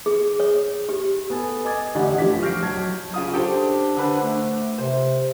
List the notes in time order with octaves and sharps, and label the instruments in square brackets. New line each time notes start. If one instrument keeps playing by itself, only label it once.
[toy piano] G#4
C#5
G4
[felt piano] B3 A4 G#5
D#5 G#5 D6 D#6 G#6 A6
A1 D3 G4 E5 F#5
F#2 F3 A3 G4 D6 B6
C#6 F6 G6 A#6 C7 D7
B1 F#3 C#5 A5 G#6
[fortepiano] C#3 F4 D#6
[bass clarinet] D4 [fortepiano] G4 A4 C5
[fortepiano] D3 B4 C5
[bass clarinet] A3
[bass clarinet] C3 [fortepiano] C5